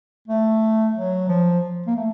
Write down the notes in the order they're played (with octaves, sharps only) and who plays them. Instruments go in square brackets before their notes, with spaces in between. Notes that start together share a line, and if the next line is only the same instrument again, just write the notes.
[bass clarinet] A3
F#3
F3
A#3
A3